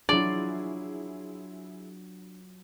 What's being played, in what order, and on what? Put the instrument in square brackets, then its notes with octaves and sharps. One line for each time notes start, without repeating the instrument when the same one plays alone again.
[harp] F#3 F4 [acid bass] D4 [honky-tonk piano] E4 G#4 [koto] D5